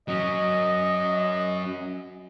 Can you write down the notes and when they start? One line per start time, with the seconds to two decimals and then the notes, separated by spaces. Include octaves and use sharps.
0.08 F#3 C#4 D#5